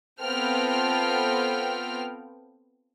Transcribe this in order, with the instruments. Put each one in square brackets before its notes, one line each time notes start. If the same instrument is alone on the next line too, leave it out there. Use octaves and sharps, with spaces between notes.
[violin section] B3 C4 F4 A4 G5 F6